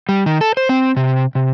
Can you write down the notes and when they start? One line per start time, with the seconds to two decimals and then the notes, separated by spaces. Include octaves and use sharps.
0.09 G3
0.26 D#3
0.41 A4
0.57 C5
0.69 C4
0.97 C3
1.35 C3